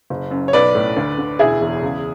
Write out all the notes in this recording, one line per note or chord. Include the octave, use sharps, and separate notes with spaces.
F#1
F#2
C#5
B1 B4 D5
A2
D2
D3
E1 E4 G#4
E2
C#2